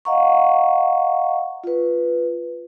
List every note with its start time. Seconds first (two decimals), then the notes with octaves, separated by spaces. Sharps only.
0.05 D#5 F5 F#5 A#5 C#6
1.64 F4 B4